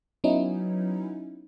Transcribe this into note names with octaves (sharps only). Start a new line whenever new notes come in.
F#3 B3 C#4 D#4 E4